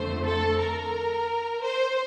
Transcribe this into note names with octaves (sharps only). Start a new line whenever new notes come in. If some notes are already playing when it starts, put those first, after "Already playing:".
Already playing: F2 D3 A3 C5
A4
A#4
C5